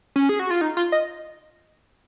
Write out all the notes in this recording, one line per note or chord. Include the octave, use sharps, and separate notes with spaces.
C#4
G#4
F#4
F4
D#4
F4
D#5